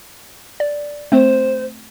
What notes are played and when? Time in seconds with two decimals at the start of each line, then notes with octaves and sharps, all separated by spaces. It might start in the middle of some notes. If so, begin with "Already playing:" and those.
0.60 D5
1.12 A3 C4 C5